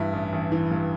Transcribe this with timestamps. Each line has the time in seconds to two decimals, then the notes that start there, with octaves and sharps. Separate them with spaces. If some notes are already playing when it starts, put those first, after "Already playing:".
Already playing: G2 E3 E4
0.13 A1
0.33 A1
0.52 E3
0.71 G2